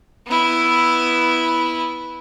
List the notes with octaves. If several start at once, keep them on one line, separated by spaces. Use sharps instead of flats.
B3 E4